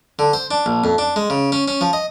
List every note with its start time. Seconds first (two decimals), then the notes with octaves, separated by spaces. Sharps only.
0.19 D3
0.33 C5
0.51 D4
0.66 A#1
0.84 F2
0.98 D4
1.16 G#3
1.30 C#3
1.52 C#4
1.68 C#4
1.81 F3
1.93 D#5